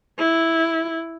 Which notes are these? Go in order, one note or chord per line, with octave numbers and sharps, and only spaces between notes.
E4